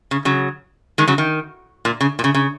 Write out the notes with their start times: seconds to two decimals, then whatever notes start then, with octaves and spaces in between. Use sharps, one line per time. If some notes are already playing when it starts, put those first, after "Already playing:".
0.11 C#3
0.25 C#3 F#3
0.98 D#3 G#3
1.08 C#3 F#3
1.18 D#3
1.85 A#2
2.01 C#3
2.19 A#2
2.24 C#3
2.35 C#3